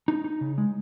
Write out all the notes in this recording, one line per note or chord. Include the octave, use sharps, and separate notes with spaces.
D#4
D#4
C#3
G#3